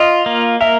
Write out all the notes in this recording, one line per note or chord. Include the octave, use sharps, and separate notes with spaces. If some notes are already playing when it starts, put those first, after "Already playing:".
Already playing: F4 D#5
A#3
A#4 E5